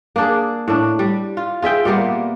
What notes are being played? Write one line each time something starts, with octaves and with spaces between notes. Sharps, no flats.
A#3 D4 G#4
A2 D4
G3
F4
F4 G#4 E5 G5
A#2 G3 A#3 B3